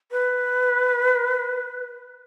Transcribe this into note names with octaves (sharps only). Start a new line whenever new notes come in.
B4